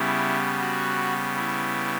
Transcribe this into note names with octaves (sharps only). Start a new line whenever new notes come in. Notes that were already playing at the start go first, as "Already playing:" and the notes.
Already playing: C#3 G3 B3 E4
F#4
E4